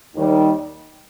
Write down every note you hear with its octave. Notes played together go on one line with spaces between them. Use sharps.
D#2 D#3 G3